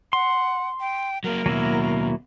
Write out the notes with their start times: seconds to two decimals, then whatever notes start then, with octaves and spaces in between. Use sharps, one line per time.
0.13 F#5 C6
0.80 G5
1.24 F#3 A#3 A#4
1.46 D#2 B2 F#3 A#3 E4